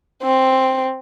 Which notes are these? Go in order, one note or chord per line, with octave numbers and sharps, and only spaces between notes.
C4